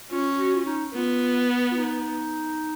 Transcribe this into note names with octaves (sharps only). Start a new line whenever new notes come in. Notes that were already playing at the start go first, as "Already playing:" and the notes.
C#4 F4
F#4
F4
D#4
B3 F4
F4
D#4